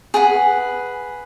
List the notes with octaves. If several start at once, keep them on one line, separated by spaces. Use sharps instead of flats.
G#4 B4 F#5